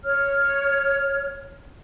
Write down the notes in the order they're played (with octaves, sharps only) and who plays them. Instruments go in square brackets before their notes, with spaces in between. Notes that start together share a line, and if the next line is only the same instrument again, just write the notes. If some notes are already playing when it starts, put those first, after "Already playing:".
[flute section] C#5 F6